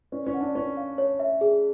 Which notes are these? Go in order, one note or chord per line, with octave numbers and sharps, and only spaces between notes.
C#4 D5
C#4
F#5
D4
C#4 C#5
F5
C#5
E5
G#4